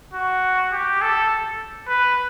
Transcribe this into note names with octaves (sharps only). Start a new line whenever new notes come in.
F#4
G4
A4
B4